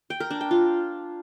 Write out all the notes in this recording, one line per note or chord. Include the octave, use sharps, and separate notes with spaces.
G5
A#4
D4
G5
F4